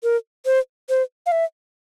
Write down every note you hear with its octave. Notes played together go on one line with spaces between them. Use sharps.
A#4
C5
C5
F5
E5